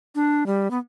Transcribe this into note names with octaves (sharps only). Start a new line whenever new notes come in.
D4
G3
B3